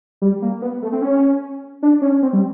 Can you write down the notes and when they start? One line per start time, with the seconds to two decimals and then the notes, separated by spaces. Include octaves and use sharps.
0.22 G3
0.42 A#3
0.62 B3
0.82 A3
0.92 C4
1.01 C#4
1.83 D4
2.02 C#4
2.23 C4
2.33 G3